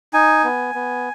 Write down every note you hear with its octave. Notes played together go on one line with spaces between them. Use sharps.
D#4 G#5
B3
B3